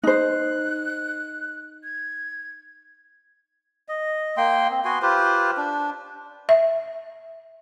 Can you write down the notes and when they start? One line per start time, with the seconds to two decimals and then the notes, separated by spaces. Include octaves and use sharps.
0.03 D#4 C5 F#6
1.84 G#6
3.89 D#5
4.37 A#3 G5 C6
4.70 C4
4.85 B3 F#4 G#5 C6
5.02 F4 G4 B4 C5
5.57 D4
6.49 E5